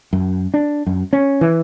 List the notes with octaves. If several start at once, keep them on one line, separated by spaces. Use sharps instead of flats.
F#2
D4
F#2
C#4
E3